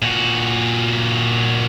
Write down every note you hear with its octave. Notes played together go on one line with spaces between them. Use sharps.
A#2 F#4